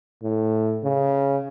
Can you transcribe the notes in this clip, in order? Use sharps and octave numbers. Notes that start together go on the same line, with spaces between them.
A2
C#3